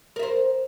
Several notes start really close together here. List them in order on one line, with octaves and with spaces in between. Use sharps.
A#4 E5 C5